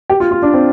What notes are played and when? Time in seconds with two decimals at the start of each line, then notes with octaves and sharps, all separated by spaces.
0.10 G4
0.20 F4
0.31 F4
0.42 D4
0.54 C4